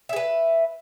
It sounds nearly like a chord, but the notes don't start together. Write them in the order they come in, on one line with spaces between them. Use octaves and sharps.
E5 G#4 B4